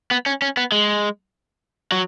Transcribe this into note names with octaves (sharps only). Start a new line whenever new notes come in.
B3
C#4
C#4
B3
G#3
F#3